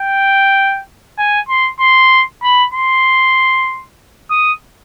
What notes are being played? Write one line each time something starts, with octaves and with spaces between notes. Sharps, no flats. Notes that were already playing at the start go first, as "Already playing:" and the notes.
Already playing: G5
G#5
C6
C6
B5
C6
D#6